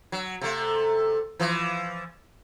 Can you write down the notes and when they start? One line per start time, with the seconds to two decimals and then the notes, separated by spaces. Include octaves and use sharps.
0.12 F#3
0.41 C3 A3
1.39 E3 F3